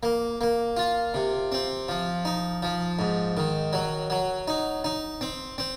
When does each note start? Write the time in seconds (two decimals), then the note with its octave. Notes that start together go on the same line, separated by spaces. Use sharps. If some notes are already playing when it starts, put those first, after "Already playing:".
0.03 A#3
0.41 A#3
0.77 F4
1.14 C3
1.52 C4
1.89 F3
2.25 D#4
2.62 F3
2.99 G#2
3.37 D#3
3.73 F#3
4.10 F#3
4.48 D#4
4.84 D#4
5.21 C4
5.58 C4